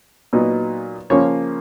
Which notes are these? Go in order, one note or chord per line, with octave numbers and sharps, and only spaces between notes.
A#2 F#3 B3 D#4
C#3 F3 A#3 C#4 C#5